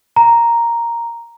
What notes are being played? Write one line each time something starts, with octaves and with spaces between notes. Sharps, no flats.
A#5